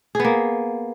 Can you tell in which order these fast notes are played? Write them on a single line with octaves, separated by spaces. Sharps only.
G#4 B3 A#3